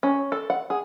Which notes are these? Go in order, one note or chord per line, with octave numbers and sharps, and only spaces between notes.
C#4
A4
F#5
G#4